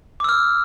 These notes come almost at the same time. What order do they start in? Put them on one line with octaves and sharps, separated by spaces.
D6 E6 F6